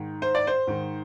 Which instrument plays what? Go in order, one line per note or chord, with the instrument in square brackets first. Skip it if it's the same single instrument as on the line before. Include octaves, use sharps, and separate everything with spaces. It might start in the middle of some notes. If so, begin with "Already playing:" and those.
Already playing: [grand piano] G#2 D#3
C5
D5
C5
G#2 D#3